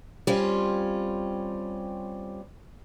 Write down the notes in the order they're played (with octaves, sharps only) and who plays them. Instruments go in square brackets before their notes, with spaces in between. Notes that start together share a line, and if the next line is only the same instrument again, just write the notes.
[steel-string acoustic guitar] G3 C4 C#4 F4